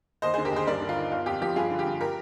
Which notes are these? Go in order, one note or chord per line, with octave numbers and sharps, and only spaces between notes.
D#2 C5 D#5
D3 G#4 C5
G4 A#4
D#2 G#4 C5
G2 A#4 D5
D3
F4
D#4
G1 F4
F2 G4
F3 G4
G2 F4 G#4
D3
G4
G2
G4 A#4